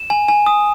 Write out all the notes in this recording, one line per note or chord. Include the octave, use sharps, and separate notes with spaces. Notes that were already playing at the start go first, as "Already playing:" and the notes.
Already playing: E7
G#5
G#5
D#6